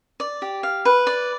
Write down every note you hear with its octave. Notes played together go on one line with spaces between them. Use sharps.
D5
G4
F5
B4
D5